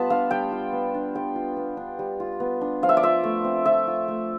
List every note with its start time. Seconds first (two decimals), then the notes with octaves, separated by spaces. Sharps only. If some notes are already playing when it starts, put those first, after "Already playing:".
Already playing: G3 B3 F4 A5 B5
0.10 D4 F5
0.31 G3 G5
0.52 F4
0.73 B3
0.95 D4
1.15 G3 G5
1.36 F4
1.56 B3
1.77 D4
1.99 G3
2.20 F4
2.40 B3
2.61 D4
2.82 F3 F5
2.89 E5
2.97 D5
3.03 F4 E5
3.24 A3
3.44 C4
3.66 F3 E5
3.87 F4
4.08 A3